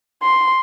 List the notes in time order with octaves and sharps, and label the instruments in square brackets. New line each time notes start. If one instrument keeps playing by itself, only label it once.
[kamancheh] C6